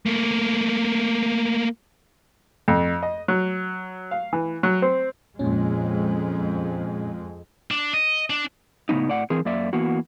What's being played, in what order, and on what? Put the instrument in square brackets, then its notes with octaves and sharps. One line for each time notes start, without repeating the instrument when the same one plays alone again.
[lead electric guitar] A3 A#3
[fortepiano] F2
D#5
F#3
F5
E3
F#3
C4
[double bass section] F2 G#3 [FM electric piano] A#2 C#4
[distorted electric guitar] D4
D#5
D4
[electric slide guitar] A2 C#3 G3 B3 D#4
A2 D5 F#5
E3 C4 G#4 A#4
F#2 A#3 D5 E5
E3 A#3 B3 F#4